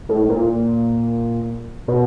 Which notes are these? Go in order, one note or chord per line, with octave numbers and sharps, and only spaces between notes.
A2
A#2
B2